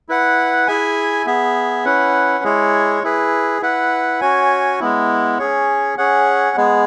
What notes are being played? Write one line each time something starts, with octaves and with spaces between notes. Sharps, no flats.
E4 B4 F#5
E4 G#4 E5 G#5
B3 G#4 E5
C#4 E4 B4 F#5
G#3 E4 G#4 C#5
E4 G#4 B4
E4 B4 F#5
C#4 F#4 C#5 G#5
G#3 B3 E4
C#4 G#4 C#5
C#4 G#4 C#5 F#5
G#3 B3 G#4